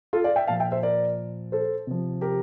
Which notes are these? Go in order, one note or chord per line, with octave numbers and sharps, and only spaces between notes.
F4 A4
D5 F5
E5 G5
A#2 F3 F5 A5
E5 G5
C5 E5
A#4 D5
A4 C5
C3 F3
G4 A#4